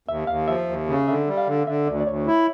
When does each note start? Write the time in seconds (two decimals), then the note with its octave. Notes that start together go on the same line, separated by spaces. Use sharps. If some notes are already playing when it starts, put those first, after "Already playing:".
0.08 D#2 E5
0.27 D#2 F5
0.48 F3 E5
0.68 D#2
0.88 C#3
1.08 D3 E5
1.27 G3
1.38 F5
1.47 D3
1.67 D3 E5
1.87 D2 D5
2.00 D5
2.07 D2 C#5
2.27 E4